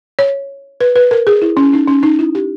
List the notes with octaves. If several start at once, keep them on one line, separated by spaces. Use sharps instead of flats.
C#5
B4
B4
A#4
G#4
E4
C#4
D#4
C#4
D#4
E4
G4